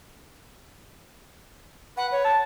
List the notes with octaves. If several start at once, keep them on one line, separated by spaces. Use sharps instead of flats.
B4 F#5
C#5
A5